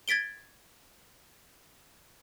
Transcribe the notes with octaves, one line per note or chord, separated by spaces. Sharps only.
G#6 A6 B6 D7 G7